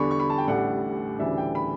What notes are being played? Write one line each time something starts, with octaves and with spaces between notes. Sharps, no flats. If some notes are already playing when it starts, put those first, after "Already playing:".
Already playing: E2 D3 G3 D4 B5 C#6
C#6
B5
A5
G5
A1 A2 G3 D4 F#5
D2 C#3 E3 G3 D4 E5
G5
B5